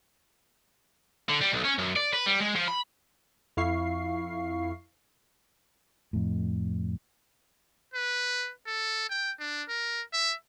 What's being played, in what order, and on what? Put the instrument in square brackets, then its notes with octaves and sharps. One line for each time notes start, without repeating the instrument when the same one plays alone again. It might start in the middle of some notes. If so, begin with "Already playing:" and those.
[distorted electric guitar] D3
G3
B1
C#4
F#2
D5
B4
G3
G#3
F3
B5
[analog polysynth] F2 E4 F5 C#6 C7
[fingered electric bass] F2 A2
[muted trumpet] B4
A4
G5
D4
A#4
E5